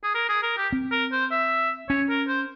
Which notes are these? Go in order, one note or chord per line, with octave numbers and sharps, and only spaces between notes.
G#4
A#4
G#4
A#4
G4
C4
A#4
C5
E5
C#4 C#5
A#4
C5